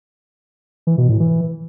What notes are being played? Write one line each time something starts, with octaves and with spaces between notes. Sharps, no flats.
E3
B2
A2
E3